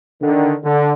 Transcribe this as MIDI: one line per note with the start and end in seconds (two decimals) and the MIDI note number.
0.22 0.53 50
0.22 0.53 51
0.63 0.92 50